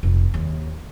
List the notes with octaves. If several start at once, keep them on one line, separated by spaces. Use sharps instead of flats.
F1
D#2